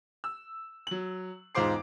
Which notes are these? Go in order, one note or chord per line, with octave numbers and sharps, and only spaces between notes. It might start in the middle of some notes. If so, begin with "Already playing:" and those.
E6
F#3 F#7
E1 G#2 F4 C5 D6 C7